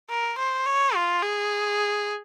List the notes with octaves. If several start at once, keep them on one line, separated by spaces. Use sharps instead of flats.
A#4
C5
C#5
F4
G#4